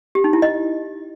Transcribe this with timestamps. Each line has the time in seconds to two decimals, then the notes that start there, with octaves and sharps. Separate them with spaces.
0.15 G4
0.24 D#4
0.33 E4
0.42 D#5